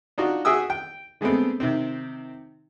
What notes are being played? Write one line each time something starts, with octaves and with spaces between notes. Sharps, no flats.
D4 D#4 F4 F#4
F#4 G#4 E5 G5 D#6 E6
G5
D3 G#3 A3 B3 C4
C3 D#3 C4